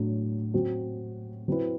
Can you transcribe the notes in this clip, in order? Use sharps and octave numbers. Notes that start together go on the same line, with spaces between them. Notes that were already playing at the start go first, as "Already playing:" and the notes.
Already playing: A2 F#3 A3 D4
F#3 C4 F#4
F#3 C4 E4 B4